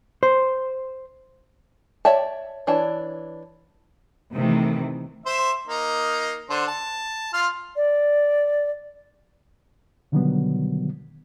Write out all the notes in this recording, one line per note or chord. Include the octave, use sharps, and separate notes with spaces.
C5
C#5 D5 E5 G5 A5
E3 D4 C#5 A5
C3 D#3 E3 A3
C5 E5
A#3 D#4
D3 D4 C5
A5
F4 C6 F6
D5
B2 D3 D#3 F#3 G3 B3